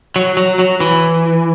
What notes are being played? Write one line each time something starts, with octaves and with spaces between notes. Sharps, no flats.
F#3
F#3
F#3
E3